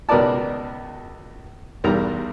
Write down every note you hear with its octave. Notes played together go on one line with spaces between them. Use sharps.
C#2 B2 A#4 B4 D5 A5
B1 E2 G3 A#4 A#5